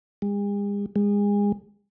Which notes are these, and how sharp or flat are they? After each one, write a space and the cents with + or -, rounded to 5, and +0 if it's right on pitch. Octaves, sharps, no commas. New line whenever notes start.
G#3 -45
G#3 -30